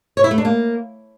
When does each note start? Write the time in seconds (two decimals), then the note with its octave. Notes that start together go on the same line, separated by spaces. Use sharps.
0.17 C#5
0.24 E4
0.31 A3
0.38 D4
0.45 A#3